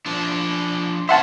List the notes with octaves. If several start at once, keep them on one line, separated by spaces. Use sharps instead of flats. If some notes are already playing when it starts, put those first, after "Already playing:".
F3 D4
C#4 C5 E5 F#5 A5 C6